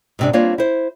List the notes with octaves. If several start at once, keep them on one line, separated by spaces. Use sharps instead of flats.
G#2 C3 D4
G3 A#3 C4 D4 F4 C#5
E4 C5